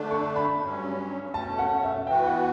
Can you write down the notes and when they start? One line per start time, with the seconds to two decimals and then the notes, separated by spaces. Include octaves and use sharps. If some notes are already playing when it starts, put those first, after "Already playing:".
Already playing: D3 A3 D4
0.11 C#6
0.36 B5
0.61 G2 F#3 C#4
1.34 B2 A3 C#4 A5
1.59 F#5
1.83 E5
2.07 E3 B3 F#4 B4 G5
2.26 F#5